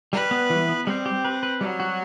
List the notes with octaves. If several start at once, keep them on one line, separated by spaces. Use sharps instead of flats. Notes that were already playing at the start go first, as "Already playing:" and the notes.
G3 B4
B3
E3
B3
G3 C4
G4
B4
B4
F#3 G3
F#4